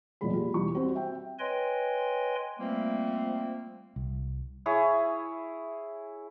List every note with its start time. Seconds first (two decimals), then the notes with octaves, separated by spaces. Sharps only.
0.21 E2 A#2 F#3 G#3 B5
0.33 F4 G4 G#4
0.54 E1 G3 E4 C#6
0.74 G3 C4 F#4 G4 C5
0.95 E5 G5
1.39 B4 C#5 D#5 G5 G#5 C6
2.60 F3 G3 A3 A#3 C4
3.96 C2
4.66 E4 G#4 C#5